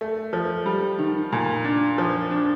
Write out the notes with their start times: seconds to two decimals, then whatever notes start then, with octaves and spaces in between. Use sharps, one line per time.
0.01 A3
0.33 F3
0.66 G3
0.99 D#3
1.32 A#2
1.64 D4
1.98 F3
2.31 D4